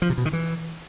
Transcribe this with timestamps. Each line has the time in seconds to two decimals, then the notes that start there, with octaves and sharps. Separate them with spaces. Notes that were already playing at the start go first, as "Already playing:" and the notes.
0.02 F3
0.10 C3
0.18 B2
0.25 D#3
0.33 E3